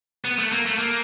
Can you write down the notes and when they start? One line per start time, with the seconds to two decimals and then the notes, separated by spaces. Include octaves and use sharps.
0.25 B3
0.39 A3
0.52 A#3
0.66 A3
0.79 A#3